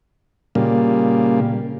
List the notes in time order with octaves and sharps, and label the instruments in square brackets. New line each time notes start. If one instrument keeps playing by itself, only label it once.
[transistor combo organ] A#2 C#3 G3 A#3